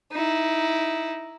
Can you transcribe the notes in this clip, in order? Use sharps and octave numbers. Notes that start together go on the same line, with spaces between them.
D#4 E4